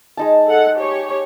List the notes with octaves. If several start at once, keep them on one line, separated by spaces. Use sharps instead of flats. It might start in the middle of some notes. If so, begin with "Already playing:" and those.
G#3 D#4 A5
A4 F#5
G4 C#5